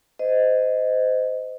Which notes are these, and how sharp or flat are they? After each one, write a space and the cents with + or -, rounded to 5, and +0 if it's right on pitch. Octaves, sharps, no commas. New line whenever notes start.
C5 -25 D#5 +0